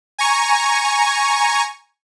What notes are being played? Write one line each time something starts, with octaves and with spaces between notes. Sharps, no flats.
G#5 A#5 C#6